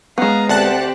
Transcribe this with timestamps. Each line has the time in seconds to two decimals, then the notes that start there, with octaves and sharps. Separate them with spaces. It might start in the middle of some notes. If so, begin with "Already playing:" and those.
0.18 G#3 B3 F5 A#5
0.49 D2 C4 G4 F#5 A5 F#6